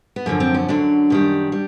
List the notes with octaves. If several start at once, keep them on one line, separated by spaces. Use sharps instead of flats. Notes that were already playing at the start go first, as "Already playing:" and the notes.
B3
F#2 D3 F3 A#3
C4
C#4
F#2 D3 F#3 D4
F#2 D#3 G3
G3